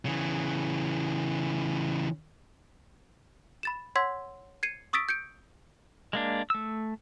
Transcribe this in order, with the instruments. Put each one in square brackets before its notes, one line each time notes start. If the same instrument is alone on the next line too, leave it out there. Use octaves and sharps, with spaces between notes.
[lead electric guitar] C#3 E3
[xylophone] B5 A6 E7
C#5 F#5 C6 E6 G#6 B6
G#6 C7 C#7 D#7
C#6 D#6 E6 A6 B6 D7
G6 C#7 D7
[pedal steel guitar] G#3 A#3 D4
A3 E6